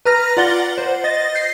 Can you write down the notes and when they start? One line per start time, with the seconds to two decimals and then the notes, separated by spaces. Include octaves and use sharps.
0.05 B4 A#5 F6 A#6
0.37 F4 D5 F#5 A6 G7
0.60 F#5
0.78 C5
1.04 D#5 A6 A#6
1.35 G6 C7